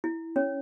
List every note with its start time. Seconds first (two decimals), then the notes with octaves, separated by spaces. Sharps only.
0.04 E4
0.36 C#4 C#5